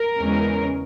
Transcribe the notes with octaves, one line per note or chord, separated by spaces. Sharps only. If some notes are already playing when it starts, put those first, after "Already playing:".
Already playing: A#4
E2 C#3 G#3 C#4